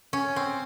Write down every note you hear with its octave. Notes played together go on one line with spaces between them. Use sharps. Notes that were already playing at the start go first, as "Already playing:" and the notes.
C#4
C4